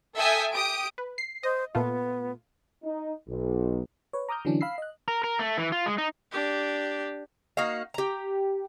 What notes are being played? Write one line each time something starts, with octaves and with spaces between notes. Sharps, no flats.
A4 E5 G5 G#5 D#6
G4 D#6 D7
B4
C7
C5 D#5
A#2 A3 B3 F4
D#4
B1
B4 C#5
A#5 D6 D#6 F6 G6
D3 E3 F#3 C#4 D4
F5 B5 E6 C7
D#5 F#6
A#4
A#4
A3
E3
F4
G#3
D#4
D4 G4
A#3 D#4 F#4 F5
G4 A#5